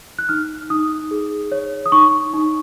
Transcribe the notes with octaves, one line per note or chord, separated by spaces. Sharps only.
F#6
D#4 F6
D#4 D#6
G#4
C#5
D#6
D#4 C#6
D#4